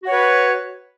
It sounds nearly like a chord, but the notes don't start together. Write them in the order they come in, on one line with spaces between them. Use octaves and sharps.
F#4 C#5 B4